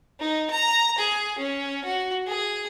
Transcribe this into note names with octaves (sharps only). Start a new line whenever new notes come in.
D#4
A#5
G#4
C#4
F#4
G#4